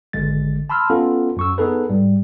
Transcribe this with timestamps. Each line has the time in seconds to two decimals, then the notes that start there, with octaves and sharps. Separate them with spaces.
0.13 G#1 D3 G#3 A6
0.70 A5 B5 C6 E6 F6
0.90 B3 C#4 F4 A4
1.37 F#2 C#6 E6
1.58 B3 D#4 G#4 A4 B4
1.90 G#2 G3